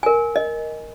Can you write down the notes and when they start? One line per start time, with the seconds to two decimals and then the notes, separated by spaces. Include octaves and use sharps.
0.03 A#4 G#5
0.36 D#5